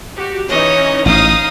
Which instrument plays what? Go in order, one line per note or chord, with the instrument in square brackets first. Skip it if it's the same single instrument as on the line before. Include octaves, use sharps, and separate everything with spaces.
[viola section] F#4 G4
[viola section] E3 C#4 D#4 [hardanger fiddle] C#5 D#5
[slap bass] A1 G#2 [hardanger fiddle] D#4 D#6 [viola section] F5